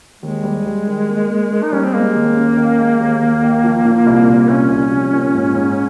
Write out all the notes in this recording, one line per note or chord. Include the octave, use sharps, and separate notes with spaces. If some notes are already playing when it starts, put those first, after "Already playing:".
D#2 G#3
G3
G3
D#3
A#3
A#3
A#3
D#4
G3 C#4
C4
G#3 A#3
D#2
C#4
D#3
G#3
D#2
D#2
D#3
F3
A#2
C2
A#2
C2 C#4
C2
F3
A#2
G#2
G#2